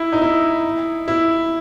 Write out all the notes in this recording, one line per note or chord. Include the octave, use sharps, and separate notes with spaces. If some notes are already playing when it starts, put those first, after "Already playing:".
Already playing: E4
D#4
E4
E4